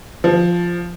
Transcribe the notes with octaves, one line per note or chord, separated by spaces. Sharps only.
F3